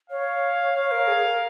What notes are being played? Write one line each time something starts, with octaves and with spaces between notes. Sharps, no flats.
C#5 F5
C#5 F5
A#4
G#4
A#4